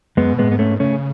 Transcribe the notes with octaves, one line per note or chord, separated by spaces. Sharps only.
F#2 G#3 B3
B2
A2 G#3 B3
G#2 B3
A3 C#4
C#3 A3 C#4